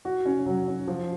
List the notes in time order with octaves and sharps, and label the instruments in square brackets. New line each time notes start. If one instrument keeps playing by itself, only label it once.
[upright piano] F#4
C#4
F#3
C#4
F3